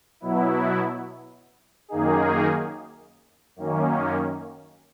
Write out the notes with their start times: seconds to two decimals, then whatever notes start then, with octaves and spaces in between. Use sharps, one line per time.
0.20 B2 F#3 B3 E4
1.88 F#2 D#3 A#3 D#4 G#4
3.56 F#2 D#3 A#3 C#4